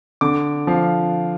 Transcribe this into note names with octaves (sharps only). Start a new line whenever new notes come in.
D3 D6
F3 F5